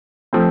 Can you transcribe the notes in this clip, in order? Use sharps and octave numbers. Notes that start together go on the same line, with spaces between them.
F3 A3 C4